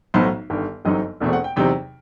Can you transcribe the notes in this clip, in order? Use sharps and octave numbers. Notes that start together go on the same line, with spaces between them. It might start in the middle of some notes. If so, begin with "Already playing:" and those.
B1 A2 F#3 B3 D#4 C5
G1 G2 D#3
G1 F#2 F#3 C4 D#4 D#5
E1 E2 B2 A3 C4
F#5
G5
E2 C3 F#3 C4 D#4 G5